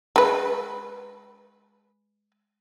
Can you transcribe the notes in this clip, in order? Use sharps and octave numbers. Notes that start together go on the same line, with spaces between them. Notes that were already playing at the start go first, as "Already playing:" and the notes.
G#3 B4